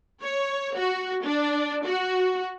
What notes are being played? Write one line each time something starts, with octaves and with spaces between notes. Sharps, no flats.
C#5
F#4
D4
F#4